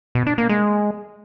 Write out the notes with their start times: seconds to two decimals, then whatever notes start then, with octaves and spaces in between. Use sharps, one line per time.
0.15 B2
0.27 D4
0.38 A#3
0.49 G#3